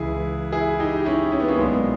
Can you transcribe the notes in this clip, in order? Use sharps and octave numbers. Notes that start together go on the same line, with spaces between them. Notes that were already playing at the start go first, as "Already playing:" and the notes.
Already playing: C#2 C#3 E3 E4 G#4
E4 G#4
D#4 G4
G4
C#4 E4
C#4
B3
A#3 C#4
B1 A#2 G#3 B3